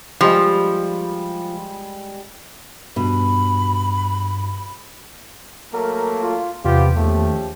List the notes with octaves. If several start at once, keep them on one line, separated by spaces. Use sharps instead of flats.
F3 G3 G#3
G2 B2 B5
F#3 A3 A#3 A#4
F4
E2 C3 B3 F4 G4
D#2 C#3 F3 A3 G4